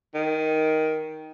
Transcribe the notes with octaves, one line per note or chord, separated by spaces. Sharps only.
D#3